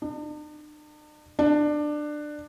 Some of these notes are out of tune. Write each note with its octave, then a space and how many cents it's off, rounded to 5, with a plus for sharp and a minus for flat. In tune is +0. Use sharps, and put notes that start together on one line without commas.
D4 +45
D4 +20